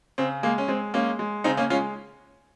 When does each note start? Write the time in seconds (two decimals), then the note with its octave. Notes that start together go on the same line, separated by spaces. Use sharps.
0.18 C#3 C4
0.43 G#3 A#3
0.58 C#4
0.68 G#3 C4
0.94 G#3 A#3 C#4
1.19 G#3
1.44 C#3 C4 D#4
1.57 A#3 C#4
1.70 G#3 C#4 F4